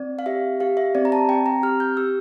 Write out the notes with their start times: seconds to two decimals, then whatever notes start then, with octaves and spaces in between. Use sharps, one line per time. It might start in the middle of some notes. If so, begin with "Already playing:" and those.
Already playing: C4 D5
0.19 F5
0.26 G4 E5
0.60 G4 F5
0.77 E5
0.95 C4 D5
1.05 A#5
1.12 A5
1.29 C4 G5
1.46 A#5
1.63 G4 F6
1.80 G6
1.97 G4 E6